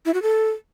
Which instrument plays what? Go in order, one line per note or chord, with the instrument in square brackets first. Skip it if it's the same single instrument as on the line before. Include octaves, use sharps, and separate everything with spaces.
[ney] E4
F#4
A4